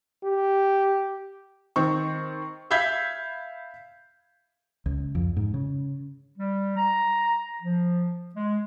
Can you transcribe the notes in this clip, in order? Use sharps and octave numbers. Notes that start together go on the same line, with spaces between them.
G4
D#3 C4 C#6
E5 F5 B5 G6 G#6 B6
C#2
F2
G#2
C#3
G3
A#5
F3
G#3